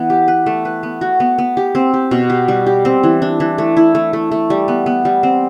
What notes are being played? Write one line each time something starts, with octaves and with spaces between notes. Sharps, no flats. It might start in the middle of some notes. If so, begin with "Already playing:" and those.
Already playing: E3 B3
G4
B4
A3
B4
B3
F#4
B3
B3
G4
C4
G4
B2
G4
G3
G4
C4
E3
D4
E3
A3
E4
A3
A3
A3
G3
B3
B3
G3
C4